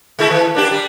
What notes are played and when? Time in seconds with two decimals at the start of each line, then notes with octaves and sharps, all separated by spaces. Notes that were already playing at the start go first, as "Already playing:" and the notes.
0.19 G#3 A3 E4
0.30 E3
0.55 A#3 D4 G4
0.71 G3